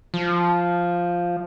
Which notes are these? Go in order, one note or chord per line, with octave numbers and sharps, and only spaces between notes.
F3